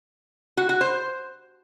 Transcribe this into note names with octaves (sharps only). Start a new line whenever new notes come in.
F#4
F#4
C5